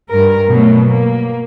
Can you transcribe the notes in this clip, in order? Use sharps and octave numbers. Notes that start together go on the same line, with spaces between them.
G2 A#4
B2 F#3 A3
A#3